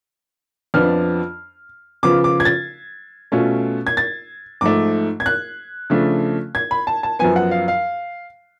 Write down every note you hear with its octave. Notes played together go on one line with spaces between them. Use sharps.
F2 F3 B3 D4 F4 F6
C#3 F3 B3 F4 D6
D6
G#6
A6
B2 A3 C#4 F4
G#6
A6
G#2 F3 A3 D6
G#6
F#6
C#3 F3 A3 D4
G#6
B5
A5
A5
F#2 F3 B3 G#5
F#5
F5
F5